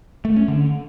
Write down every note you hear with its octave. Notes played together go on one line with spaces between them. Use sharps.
A3
C#4
D3